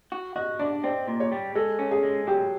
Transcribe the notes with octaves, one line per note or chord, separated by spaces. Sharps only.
F#4
F#4 D#5
D4 D5
C4 D5
A#2
C#5
G3
G#3 A4
C#4
G#4
G#3
F#3 G4